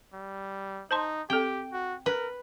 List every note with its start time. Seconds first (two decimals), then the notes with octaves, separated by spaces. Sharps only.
0.13 G3
0.91 D#4 C5 A5 C6
1.30 C4 G4 A4 G5
1.72 F#4
2.06 A#4 B4